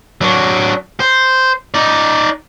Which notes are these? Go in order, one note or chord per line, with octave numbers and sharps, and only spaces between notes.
F#3 D4
C5
D#4 D5